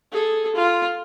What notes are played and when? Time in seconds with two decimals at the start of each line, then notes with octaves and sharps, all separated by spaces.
0.12 G#4 A4
0.56 F4